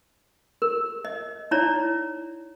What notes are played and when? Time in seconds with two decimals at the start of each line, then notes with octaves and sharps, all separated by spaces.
0.62 A#4
1.05 D#5
1.51 D#4 E4 C#5 D5 A#5